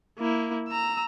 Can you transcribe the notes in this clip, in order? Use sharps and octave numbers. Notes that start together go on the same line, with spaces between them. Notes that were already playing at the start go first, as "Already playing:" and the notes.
A#3 E4
A#5 E6